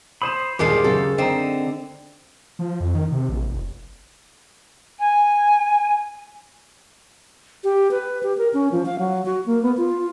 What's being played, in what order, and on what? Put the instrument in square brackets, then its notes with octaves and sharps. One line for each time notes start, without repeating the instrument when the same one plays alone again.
[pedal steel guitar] C5 B5 [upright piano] D#6 D#7 E7
[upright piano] G1 D#2 [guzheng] A#2 G#3 F5 [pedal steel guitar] G4 C5
[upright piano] F#2 C#3 F#3 [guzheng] A4
[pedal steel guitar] D3 [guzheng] C4 [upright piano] D#4 D#5 A#5
[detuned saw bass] F3
F2
D#3
C3
A#1
F1
[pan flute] G#5
[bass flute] G4
B4
G4
A#4
C#4
F3
F5
F#3
F#4
A#3
B3
F4